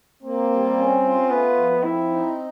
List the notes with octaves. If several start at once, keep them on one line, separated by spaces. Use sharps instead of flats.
A#3 C4
G3
C#4
F4
A3 B3
F3
C4 E4
D#4